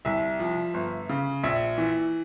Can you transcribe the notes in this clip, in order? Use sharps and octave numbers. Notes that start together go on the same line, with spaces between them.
C2 E5
F3
G1
C#3
A#1 E5
E3